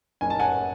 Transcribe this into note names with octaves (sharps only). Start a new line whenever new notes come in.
F#1 G#5
A5
F#5 G#5